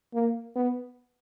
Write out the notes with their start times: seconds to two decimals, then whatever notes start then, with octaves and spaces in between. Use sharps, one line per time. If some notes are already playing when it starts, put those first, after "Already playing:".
0.14 A#3
0.56 B3